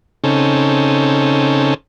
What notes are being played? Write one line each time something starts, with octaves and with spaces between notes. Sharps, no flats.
C#3 C4 C#4 D#4 A4